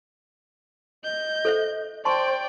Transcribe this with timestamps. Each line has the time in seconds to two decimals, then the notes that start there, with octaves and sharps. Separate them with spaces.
1.04 D#5 G6
1.45 A4 C5 E5
2.05 C5 D5 G5 A5 C6 C#6